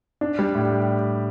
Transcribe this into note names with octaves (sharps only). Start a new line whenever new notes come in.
D4
G3
A2
G4